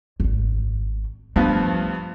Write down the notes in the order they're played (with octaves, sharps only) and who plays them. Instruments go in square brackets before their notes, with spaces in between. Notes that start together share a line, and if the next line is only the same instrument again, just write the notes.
[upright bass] D#1 G#1
[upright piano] G2 F3 B3 [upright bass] A3